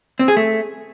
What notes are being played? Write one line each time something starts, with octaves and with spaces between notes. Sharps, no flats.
C4
G#4
A3